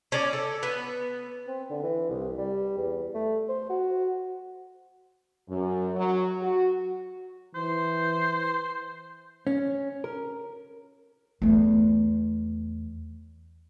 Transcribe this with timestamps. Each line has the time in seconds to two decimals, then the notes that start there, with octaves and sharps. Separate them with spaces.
0.12 C#4 D5
0.33 A4
0.63 B3
1.48 C4
1.70 D3
1.83 E3
2.09 C2
2.38 G3
2.78 E2
3.14 A3
3.48 C5
3.70 F#4
5.48 F#2
5.96 F#3
6.41 F#4
7.55 E3 C5
9.47 C#4
10.04 A#4
11.42 E2 A3